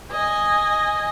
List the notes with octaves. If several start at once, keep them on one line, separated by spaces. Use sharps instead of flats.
D#5 G#5